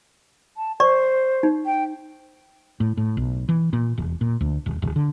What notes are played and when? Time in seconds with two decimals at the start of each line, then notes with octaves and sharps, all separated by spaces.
0.57 A5
0.80 C5 D5 C#6
1.43 D#4
1.66 G5
2.80 A2
2.97 A2
3.17 B1
3.49 E3
3.73 A#2
3.98 E1
4.21 A#2
4.41 D2
4.66 D#1
4.82 D1
4.96 D3